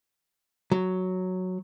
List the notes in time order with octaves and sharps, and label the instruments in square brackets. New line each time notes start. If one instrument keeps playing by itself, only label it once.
[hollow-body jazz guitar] F#3